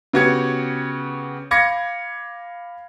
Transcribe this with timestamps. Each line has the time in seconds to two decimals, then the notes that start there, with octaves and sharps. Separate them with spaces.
0.13 C#3 B3 F#4 G4 G#6 C#7
1.51 F5 B5 D6 G#6 A#6 C#7